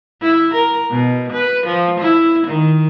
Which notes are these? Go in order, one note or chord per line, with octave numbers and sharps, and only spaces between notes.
E4
A#4
B2
B4
F3
E4
D#3